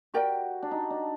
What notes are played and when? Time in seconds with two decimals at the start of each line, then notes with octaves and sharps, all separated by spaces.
0.14 F#4 G4 A#4 D5 G5
0.62 D4
0.71 D#4
0.90 D4